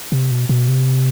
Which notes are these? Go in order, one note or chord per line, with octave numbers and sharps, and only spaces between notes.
C3
B2
B2
C3